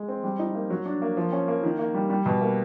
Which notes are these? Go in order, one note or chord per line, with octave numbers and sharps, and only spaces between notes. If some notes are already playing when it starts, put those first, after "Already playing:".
Already playing: G#3
C4
G3
D#4
A#3
F#3
D4
A#3
F3
C#4
A#3
D#3
A#3
G3
G3
B2
A#3